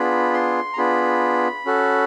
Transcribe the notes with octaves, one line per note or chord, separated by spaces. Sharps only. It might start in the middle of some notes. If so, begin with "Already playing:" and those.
Already playing: B3 D4 F4 G#4 B5
C6
A#5
B3 D4 F4 G#4 B5
C#4 F#4 A4